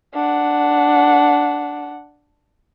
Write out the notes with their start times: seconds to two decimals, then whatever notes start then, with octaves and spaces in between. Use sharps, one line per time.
0.14 D4 F#5